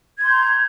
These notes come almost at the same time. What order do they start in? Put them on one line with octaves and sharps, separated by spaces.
G#6 C6 G6 A#5